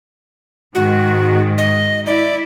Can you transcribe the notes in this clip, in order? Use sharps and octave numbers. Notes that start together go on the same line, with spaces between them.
G#2 D#3 F#4
D#5
E4 D5